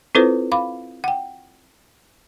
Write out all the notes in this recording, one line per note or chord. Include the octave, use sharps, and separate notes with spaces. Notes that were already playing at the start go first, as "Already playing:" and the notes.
C4 E4 F4 A4 B4 C5
F5 B5 D6
F#5 G5